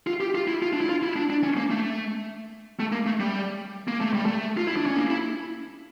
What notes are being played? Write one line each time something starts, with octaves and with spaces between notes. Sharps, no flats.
F4
G4
F4
E4
F4
D4
E4
F4
E4
D4
D4
C#4
A#3
A3
A3
A#3
A3
G3
A#3
A3
G3
A3
F4
E4
D4
C#4
A#3
E4